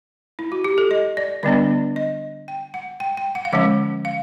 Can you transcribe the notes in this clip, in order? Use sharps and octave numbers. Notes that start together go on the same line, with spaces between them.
E4
F#4
G4
A4
D#5
D5
D3 G3 B3 D4 D5
D#5
G5
F#5
G5
G5
F#5
F5
D3 F3 G#3 C#4 F#5
F5